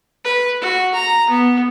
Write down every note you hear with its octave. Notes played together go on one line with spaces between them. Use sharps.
B4
F#4
A#5
B3